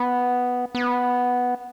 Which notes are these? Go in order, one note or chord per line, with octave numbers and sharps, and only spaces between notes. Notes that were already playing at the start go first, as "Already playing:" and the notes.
Already playing: B3
B3